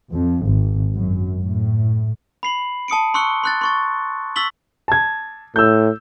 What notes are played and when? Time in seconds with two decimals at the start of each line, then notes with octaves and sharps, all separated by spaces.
0.12 F2
0.44 G#1
0.95 F#2
1.41 A2
2.43 B5 C7 F#7
2.88 A5 D#6 C#7 D7
3.14 C6 C#6 E6 F#6 C#7 G7
3.44 C6 F#6 A6
3.61 C6 C#6 A6
4.36 C#6 E6 A6 B6 F#7 G7
4.88 A5 G#6
5.56 A2 E6 G6